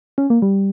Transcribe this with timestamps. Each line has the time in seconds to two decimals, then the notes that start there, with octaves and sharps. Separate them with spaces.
0.18 C#4
0.30 A#3
0.42 G3